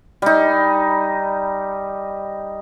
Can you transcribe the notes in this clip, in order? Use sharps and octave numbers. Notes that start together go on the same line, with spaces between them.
G3 D#4